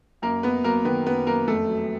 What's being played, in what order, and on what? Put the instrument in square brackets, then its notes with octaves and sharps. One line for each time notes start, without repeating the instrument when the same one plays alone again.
[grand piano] F#2 A#3 A#4
F#2 B3 B4
F#3 A#3 A#4
D#3 B3 B4
F#2 B3 B4
F#2 A#3 A#4
F2 A3 A4
F#3